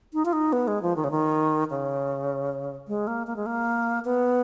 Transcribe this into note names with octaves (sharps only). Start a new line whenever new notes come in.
D#4
F4
D#4
B3
G#3
F3
D#3
C#3
D#3
C#3
G#3
A#3
A#3
G#3
A#3
B3